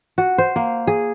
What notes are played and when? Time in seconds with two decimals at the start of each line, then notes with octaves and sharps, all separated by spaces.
0.18 F#4
0.38 C5
0.56 A#3
0.87 G#4